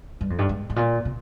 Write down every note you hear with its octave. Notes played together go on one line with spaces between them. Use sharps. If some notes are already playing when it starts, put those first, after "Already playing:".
G2
F2
G2
G#2
G#2
A#2
C3